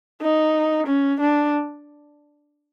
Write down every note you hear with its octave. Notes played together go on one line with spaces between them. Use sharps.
D#4
C#4
D4